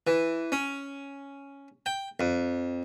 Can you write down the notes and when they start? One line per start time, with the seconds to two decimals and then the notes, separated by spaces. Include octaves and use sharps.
0.07 E3
0.52 C#4
1.86 G5
2.20 F2